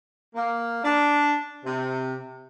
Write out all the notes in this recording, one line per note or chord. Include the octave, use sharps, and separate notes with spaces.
A#3
D4
C3